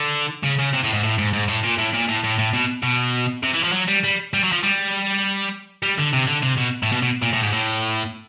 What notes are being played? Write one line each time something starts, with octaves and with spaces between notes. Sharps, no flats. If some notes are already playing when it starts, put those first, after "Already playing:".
Already playing: D3
C#3
C#3
C3
A2
G#2
A2
G#2
G#2
A2
A#2
A2
A#2
A2
A2
A2
B2
B2
C3
E3
F3
F#3
G3
G3
G3
F#3
F3
G3
G3
D3
C3
D3
C3
B2
A2
B2
B2
A#2
A2
G#2
A2